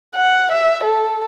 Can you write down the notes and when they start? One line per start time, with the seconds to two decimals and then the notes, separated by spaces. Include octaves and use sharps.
0.16 F#5
0.51 E5
0.83 A4